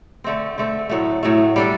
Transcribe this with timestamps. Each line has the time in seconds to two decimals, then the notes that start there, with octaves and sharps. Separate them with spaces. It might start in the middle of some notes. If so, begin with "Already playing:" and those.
0.24 D3 A3 C4
0.58 D3 A3 C4
0.90 A2 F#3 A3
1.23 A2 F#3 A3
1.56 G3 D4 A4